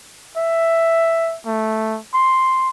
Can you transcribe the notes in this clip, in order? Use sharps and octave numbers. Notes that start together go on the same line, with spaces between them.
E5
A3
C6